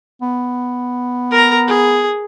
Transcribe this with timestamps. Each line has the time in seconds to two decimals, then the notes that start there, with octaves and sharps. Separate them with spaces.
0.22 B3
1.31 A#4 A#5
1.68 G#4